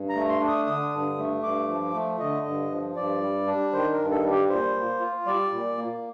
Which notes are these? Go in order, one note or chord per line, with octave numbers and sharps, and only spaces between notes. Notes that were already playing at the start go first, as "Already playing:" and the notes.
Already playing: G2
A#5
A3
C6
D4
D#6
D3 D#6
G2
A3
G2 D6
F3
A3
D3 D#5
G2
F3
G2 D5
G3
D4
D#3 C5
A#4
G2
A4
G3
G4
A#2 C5
A#3
F4
G3 D5
A#2
A#3